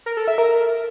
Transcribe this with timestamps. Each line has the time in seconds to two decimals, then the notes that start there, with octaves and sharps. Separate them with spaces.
0.06 A#4
0.17 A4
0.28 E5
0.38 A#4